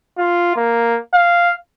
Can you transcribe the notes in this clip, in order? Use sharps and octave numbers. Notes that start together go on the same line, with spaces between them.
F4
A#3
F5